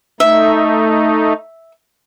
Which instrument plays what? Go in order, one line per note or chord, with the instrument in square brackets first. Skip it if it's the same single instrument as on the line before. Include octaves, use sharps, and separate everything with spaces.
[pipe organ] A3 D#4 [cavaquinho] E5